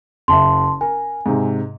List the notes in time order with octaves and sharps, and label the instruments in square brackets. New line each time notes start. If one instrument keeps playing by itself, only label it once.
[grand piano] F#1 E5 [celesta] A5 C6
[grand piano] A#4 [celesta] G#5
[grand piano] G#2 C3